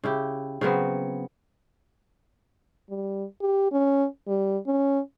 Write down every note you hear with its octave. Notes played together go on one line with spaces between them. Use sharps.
C#3 E4 G4
C#3 F#3 B3 C4
G3
G4
C#4
G3
C#4